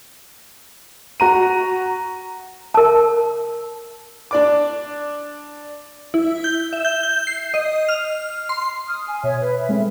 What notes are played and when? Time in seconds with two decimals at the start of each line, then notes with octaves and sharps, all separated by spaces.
1.20 F#4 A#5 D#7
2.74 A#4 A5
4.31 D4 D5 D6
6.14 E4
6.44 G6
6.73 E5
6.85 G6
7.03 G6
7.27 C7
7.54 D#5
7.88 F6
8.49 C6
8.88 D#6 F6
9.08 G#5
9.23 B2 C#5 E5
9.41 B4
9.55 E5
9.69 G#3 A3 C4